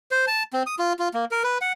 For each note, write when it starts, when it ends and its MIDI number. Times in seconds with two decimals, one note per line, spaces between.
0.11 0.25 72
0.27 0.43 81
0.53 0.63 60
0.66 0.75 87
0.79 0.93 65
0.99 1.09 65
1.14 1.25 58
1.31 1.43 70
1.43 1.58 71
1.61 1.73 78